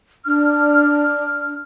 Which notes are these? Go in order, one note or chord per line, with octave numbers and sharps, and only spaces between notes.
D4 F6